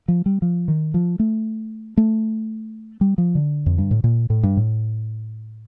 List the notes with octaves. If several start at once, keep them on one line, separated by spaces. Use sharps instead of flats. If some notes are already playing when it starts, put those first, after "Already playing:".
F3
G3
F3
D#3
F3
A3
A3
G3
F3
D3
F2
G2
A2
A#2
A2
G2
A2